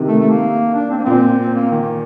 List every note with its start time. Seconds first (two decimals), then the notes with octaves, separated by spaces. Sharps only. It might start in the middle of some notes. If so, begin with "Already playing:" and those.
Already playing: C3 D#3
0.08 A3
0.20 A3
0.30 A#3
0.74 D4
0.90 C4
0.98 A#3
1.04 A#2 C4
1.39 C4
1.55 A#3
1.71 D#3
1.81 D#3